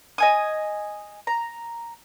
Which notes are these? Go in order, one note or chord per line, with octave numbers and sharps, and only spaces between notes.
D#5 G#5 D#6
A#5